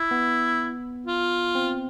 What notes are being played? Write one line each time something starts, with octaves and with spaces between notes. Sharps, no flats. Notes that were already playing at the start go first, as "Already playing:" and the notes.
Already playing: E4
B3
F4
C4